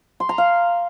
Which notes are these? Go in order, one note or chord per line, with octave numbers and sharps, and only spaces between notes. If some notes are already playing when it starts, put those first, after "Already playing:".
C6
A#5
F5